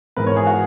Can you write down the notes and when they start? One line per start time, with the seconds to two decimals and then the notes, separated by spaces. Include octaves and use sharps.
0.17 G#2 E3 B3 E4 A#4 B4
0.27 C#5
0.36 G#4
0.47 F#4